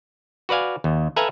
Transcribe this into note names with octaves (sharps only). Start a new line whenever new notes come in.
F#4 B4 D5 F5 G#5
D#2
A4 B4 E5 F5 G#5 A#5